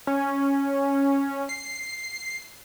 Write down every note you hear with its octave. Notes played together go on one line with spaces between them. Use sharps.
C#4
C7